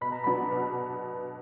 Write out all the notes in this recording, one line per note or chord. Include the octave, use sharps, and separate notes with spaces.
B2 B5
A#5
F#3 B3 D4 B5
B2